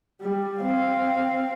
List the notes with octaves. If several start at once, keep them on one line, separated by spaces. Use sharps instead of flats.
G3
C4 F5